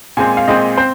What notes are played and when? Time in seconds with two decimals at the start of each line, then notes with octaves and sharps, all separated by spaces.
0.17 A#2 G#3 C4 G#5
0.37 F5
0.48 A#2 G#3 C4 D#5
0.77 C4 C5